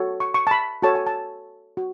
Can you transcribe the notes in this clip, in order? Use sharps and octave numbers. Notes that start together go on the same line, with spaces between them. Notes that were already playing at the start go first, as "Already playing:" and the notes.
Already playing: F#4 A4 C#5
C#6
C#6
A5
B5
F#4 A4 C#5 A5
G#5
A5
F#4